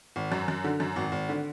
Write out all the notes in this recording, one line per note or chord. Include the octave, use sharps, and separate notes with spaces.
G#1
F#2
F#2
D3
F#2
G#1
G#1
D3